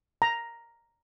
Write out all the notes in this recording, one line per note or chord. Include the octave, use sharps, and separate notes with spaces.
A#5